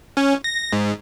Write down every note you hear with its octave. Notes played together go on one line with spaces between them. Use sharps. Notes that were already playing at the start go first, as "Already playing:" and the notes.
C#4
A#6
G#2